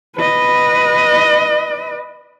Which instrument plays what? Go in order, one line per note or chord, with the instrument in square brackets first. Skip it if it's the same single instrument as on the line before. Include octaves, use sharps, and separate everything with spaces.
[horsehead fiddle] B4 D#5